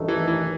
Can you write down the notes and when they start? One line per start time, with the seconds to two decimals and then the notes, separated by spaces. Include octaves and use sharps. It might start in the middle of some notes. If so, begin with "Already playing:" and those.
Already playing: A1 G2 D#3 A3 D#4
0.08 E3
0.28 E3